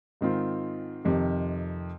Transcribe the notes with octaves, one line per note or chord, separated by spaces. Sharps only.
G#2 D#3 C4 F4
F2 C3 D#3